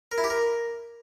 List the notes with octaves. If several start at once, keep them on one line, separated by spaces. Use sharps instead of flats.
A#4
E4
G4
A#4